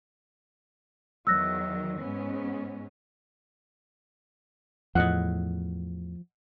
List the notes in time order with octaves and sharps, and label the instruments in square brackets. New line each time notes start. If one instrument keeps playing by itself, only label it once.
[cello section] E2 D#3 F#3 [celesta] E6 F#6 A#6
[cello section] G#2 B3 C#4
[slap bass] E2 A2 [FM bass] F3 [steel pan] D#5 F#5